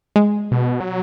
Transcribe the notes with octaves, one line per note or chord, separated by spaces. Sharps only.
G#3
B2
F#3